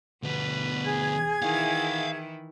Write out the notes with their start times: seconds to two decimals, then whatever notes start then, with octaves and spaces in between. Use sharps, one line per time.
0.23 D2 B2 B3 B4
0.84 G#4 G#6
1.42 D#3 E3 E4 F5 F#5